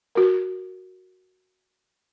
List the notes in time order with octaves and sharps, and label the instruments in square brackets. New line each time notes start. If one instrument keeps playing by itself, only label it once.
[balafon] F#4 A#4